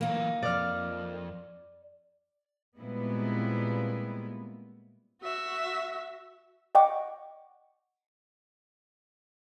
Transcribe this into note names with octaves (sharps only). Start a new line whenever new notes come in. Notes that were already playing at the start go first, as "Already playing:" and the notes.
E3 F#3 A#3 D#4
B1 F2 D5 F6
A#2 G3 G#3 B3 C4 E4
F#4 E5
D5 D#5 F#5 G5 C#6 D6